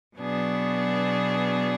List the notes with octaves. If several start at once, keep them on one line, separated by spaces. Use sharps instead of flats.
B2 F#3 B3 D4 G#4